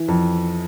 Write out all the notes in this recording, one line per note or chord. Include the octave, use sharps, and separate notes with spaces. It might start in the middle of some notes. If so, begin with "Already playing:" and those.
Already playing: E3
F2